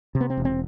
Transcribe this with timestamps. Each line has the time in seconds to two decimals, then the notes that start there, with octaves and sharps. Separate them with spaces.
0.15 C3
0.21 B3
0.30 C4
0.37 E1
0.45 C4